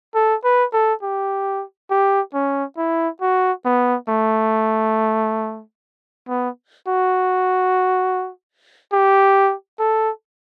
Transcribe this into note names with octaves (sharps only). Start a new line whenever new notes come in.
A4
B4
A4
G4
G4
C#4
E4
F#4
B3
A3
B3
F#4
G4
A4